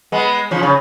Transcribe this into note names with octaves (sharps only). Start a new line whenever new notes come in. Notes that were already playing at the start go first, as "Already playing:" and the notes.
G#3 B3
C#3 F3
C#3